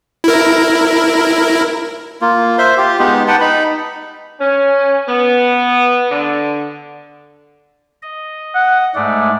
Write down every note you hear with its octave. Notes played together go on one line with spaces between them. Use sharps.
E4 A#4
A#3 F4
C5 E5 C6
F4 G4
G#3 B3 D#4 G4
B4 F#5 G5 A5
D#4 B5
C#4
B3
D3
D#5
F#5
G#2 G#3 A3 D5